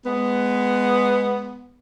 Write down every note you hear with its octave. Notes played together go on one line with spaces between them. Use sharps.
G#3 B3